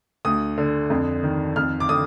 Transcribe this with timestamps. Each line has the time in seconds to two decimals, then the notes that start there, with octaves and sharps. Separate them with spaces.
0.25 D2 D#6
0.58 D3
0.90 F2
1.23 D#3
1.56 F2 F6
1.80 D6
1.89 D3 D#6